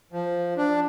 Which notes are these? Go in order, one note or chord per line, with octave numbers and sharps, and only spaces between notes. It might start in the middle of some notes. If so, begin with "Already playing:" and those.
F3
D4